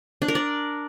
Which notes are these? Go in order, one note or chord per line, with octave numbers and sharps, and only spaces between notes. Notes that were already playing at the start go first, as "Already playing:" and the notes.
D4
A#4
D5